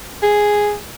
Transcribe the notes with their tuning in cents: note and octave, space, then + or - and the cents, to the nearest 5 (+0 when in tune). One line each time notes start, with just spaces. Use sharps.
G#4 +0